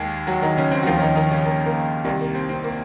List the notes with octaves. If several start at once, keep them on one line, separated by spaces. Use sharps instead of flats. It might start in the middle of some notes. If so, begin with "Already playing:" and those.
Already playing: D#2 D#3 G#3 G#4
F#3 F#4
D#3 D#4
C#3 C#4
C4
F#4
D#2 D#3 F3 F4
C#4
D#3 D#4
D#3 D#4
C#3 C#4
A#3
A#3
C2 C3 D#3
A#3
C4
C4
A#3